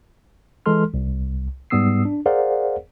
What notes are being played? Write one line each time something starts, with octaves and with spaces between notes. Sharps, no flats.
E3 G#3 A4 C6 F6
C2
G#2 G3 B3 D#6 E6 C7
D4
G#4 A#4 C5 D5 F5 F#5